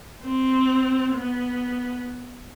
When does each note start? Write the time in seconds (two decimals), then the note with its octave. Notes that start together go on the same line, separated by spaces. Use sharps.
0.24 C4
1.14 B3